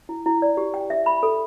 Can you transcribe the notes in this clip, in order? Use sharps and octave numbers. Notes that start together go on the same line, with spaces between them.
E4
E4
D5
G4
G5
E5
B5
A4